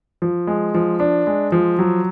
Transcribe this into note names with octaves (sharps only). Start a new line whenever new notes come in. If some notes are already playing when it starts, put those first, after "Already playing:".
F3
G#3
F3
D4
G#3
F3
F#3